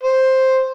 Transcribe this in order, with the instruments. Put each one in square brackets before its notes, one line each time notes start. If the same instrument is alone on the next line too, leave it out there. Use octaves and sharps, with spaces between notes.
[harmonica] C5